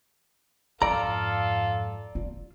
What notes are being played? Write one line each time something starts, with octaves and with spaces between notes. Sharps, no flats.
F2 G#2 F4 A4 D5 F5 A#5
F4